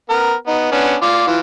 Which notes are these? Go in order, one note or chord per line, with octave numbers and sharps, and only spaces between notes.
B3 A#4
B3 D#4
B3 C#4 D4
F4 D5 F5
E3 F4